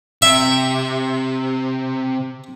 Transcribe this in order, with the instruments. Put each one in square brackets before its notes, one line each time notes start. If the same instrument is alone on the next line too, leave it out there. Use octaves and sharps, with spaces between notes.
[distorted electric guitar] C3 [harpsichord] E5